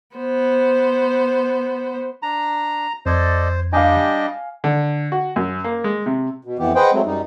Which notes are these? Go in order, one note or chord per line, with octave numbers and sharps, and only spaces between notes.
B3 C5
D4 A#5
F2 A4 C5 D5 D#5 G#6
G3 D4 G4 D#5 F5 G5 G#5
D3
F#4
F#2
A#3
G#3
C3
B2
F2 E3 B3 G4
G#4 B4 C5 D#5 F#5 G5
F#3 G#3 A3 C4
F#2 G3 D#4